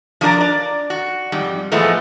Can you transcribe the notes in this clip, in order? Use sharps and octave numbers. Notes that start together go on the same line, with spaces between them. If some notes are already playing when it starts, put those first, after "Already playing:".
F3 F#3 D4 A#4 D5 A#5
D5
F#4
F2 G#2 G3
A2 E3 F3 G#3 A3 B3